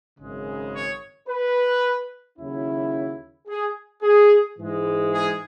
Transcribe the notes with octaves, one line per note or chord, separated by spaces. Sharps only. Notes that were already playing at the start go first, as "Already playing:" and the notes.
G#1 F#2 C#3 G#3
C#5
B4
D#2 C#3 F#3 C#4 E4
G#4
G#4
G#2 E3 G#3
G#4